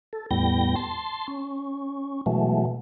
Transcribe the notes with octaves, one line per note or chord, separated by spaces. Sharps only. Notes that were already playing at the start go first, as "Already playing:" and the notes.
A4
E2 A2 G3 B3 G5 A#6
A5 C6
C#4
B2 E3 F#3 G#3 A3